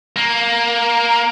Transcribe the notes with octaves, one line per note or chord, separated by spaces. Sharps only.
A#3